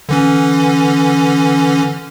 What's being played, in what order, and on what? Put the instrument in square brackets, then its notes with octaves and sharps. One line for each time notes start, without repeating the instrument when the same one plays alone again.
[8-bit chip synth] D3 E3 C#4